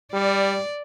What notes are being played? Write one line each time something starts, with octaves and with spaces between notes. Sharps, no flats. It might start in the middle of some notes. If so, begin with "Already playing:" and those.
G3 D5